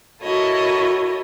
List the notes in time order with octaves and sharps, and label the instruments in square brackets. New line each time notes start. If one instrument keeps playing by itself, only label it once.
[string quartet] E4 F#4 A4 A#4 C#5 D#5